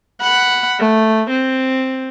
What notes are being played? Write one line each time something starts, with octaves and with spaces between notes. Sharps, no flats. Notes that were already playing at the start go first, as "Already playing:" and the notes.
F#5 B5
A3
C4